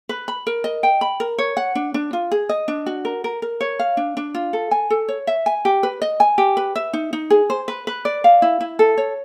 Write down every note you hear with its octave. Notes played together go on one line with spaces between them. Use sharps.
B4
B5
A#4
D#5
G5
B5
A#4
C#5
F#5
D4
D4
F4
G#4
D#5
D4
F#4
A#4
A#4
A#4
C#5
F5
D4
D4
F4
A4
G#5
A4
C#5
E5
G#5
G4
B4
D#5
G#5
G4
B4
E5
D#4
D#4
G#4
C5
B4
B4
D5
F5
E4
E4
A4
C#5